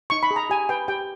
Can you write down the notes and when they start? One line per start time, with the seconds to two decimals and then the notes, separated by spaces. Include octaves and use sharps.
0.10 D#4 C#6
0.23 B5
0.31 G#4
0.36 A#5
0.50 G4 G#5
0.69 B4 G5
0.88 G4 G5